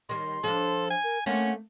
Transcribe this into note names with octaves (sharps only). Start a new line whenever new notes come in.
D#3 G3 C6
F3 D4 A4
G#5
A#4
A3 A#3 C4 C#4 F#5